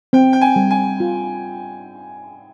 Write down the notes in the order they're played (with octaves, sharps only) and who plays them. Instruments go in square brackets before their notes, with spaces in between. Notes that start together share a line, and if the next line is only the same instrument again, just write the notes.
[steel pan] C4 [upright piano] G5
[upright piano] G5
G#5
[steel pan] G3
[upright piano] G#5
[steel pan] F4